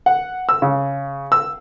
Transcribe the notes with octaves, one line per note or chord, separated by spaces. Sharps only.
F#5
E6
C#3
E6